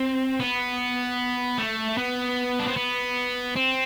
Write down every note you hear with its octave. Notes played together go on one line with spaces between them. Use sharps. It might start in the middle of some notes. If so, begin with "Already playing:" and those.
Already playing: C4
B3
A3
B3
D4
C4
B3
C4